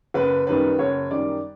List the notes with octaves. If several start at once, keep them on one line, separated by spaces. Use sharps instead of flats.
F#1 B4
F#2 D#3 G3 B4
F#1 C#5
F#2 D#3 G3 D5